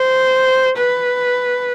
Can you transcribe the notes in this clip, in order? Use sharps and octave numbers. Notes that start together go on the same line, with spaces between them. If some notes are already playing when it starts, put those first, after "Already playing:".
Already playing: C5
B4